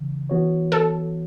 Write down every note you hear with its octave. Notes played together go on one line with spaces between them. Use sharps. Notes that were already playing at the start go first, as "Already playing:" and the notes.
Already playing: C#3 E3
E3 B3 F#4 C#5
A4